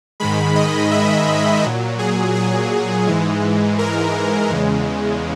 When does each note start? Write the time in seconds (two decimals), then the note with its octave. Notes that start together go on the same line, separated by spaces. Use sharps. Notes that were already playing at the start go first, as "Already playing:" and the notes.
0.20 G#2 D#3 G#3 B5
0.56 D#5
0.91 E5
1.63 A#2 F#3
1.99 G#4
2.35 G#4
3.07 G#2 E3 G#3
3.79 A#4
4.50 E2 C#3 G#3